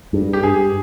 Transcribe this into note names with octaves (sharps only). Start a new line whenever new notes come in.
G2
G4
G2 G#4